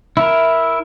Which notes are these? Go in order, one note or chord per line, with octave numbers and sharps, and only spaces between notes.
E4 A#4